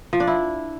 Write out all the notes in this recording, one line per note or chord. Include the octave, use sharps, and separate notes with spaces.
F3
D4
E4